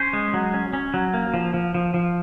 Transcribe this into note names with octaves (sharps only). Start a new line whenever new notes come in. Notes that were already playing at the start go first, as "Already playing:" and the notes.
Already playing: C#4 C5
G#3
F#3
C#4
C#4
F#3
A#3
F3
F3
F3
F3